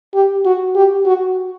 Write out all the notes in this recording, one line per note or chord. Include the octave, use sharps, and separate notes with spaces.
G4
F#4
G4
F#4